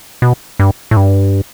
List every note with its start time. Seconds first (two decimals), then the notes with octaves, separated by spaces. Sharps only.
0.22 B2
0.59 G2
0.91 A2
0.97 G2